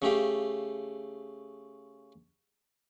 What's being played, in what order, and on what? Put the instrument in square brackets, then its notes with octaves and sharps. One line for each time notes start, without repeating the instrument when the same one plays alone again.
[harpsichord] C#3 A3 G4 F5